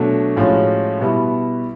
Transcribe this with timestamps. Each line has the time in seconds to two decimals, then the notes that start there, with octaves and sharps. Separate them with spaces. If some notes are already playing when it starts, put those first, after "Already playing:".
Already playing: B2 F#3 A3 D4
0.37 A2 F3 G#3 C#4 F#4
1.01 B2 G3 B3 E4